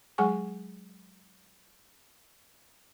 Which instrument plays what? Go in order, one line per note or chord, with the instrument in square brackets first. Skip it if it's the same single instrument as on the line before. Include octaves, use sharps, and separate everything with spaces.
[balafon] F#3 G#3 G#4 F#5 G#5 C#6